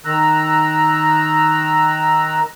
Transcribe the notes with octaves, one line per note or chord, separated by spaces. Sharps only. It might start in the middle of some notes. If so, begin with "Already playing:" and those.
D#3 A#5 E6 F#6